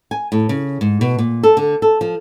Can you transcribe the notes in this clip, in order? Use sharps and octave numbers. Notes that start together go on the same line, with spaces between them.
G#5
A2
C#3
G#2
B2
A#2
A4
D3
A4
F3